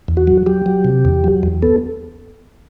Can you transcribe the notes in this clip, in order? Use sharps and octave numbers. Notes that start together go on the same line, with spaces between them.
E2
F#4
F#3
F#3 G4
F#3
C3
E2
F#3
E2
B3 A4